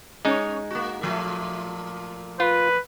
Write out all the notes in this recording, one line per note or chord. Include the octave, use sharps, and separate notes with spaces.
G#3 C#4 D#4 C#5
A#3 F#4
A#2 F3 A3
F4 B4